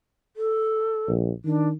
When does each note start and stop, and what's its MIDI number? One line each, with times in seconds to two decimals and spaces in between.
0.37 1.11 69
1.08 1.31 34
1.45 1.73 51
1.45 1.68 62